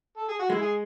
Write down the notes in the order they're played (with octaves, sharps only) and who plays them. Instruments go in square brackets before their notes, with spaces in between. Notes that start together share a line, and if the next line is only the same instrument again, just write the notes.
[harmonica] A4
G#4
F#4
[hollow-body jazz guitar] G#3 [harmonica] E4
[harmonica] G#4